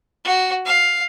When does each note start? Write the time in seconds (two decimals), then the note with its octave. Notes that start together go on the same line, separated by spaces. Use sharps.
0.25 F#4
0.66 F5